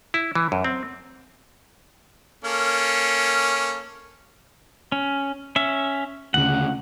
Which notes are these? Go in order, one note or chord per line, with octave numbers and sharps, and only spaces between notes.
E4
E3
F#2
C4
A#3 C#4 A4
C#4
C#4 E5
D2 C#3 F#5